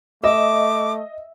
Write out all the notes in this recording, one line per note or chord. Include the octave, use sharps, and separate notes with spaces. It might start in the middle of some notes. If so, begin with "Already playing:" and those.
A3 D#5 E5 D6